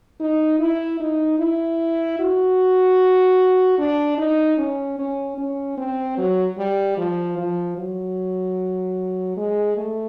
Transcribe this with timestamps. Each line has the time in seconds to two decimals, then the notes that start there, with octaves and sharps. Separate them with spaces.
0.20 D#4
0.59 E4
1.00 D#4
1.39 E4
2.19 F#4
3.78 D4
4.18 D#4
4.58 C#4
4.98 C#4
5.38 C#4
5.77 C4
6.17 F#3
6.58 G3
6.97 F3
7.38 F3
7.78 F#3
9.37 G#3
9.77 A3